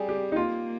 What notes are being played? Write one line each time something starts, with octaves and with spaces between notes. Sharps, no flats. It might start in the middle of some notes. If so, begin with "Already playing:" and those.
Already playing: G3 G#4
G4
D#4
A#3 F4